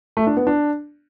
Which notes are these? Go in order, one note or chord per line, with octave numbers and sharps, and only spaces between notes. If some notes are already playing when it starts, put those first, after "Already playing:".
A3
D4
B3
D4